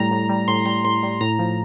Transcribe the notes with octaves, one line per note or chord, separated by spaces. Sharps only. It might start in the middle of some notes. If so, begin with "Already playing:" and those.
Already playing: A2 G3 A#5
A2
G3
A2 C6
G3 C6
A2 C6
G3
A2 A#5
F3